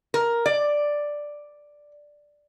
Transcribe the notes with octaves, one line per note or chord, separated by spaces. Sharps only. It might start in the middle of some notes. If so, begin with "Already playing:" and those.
A#4
D5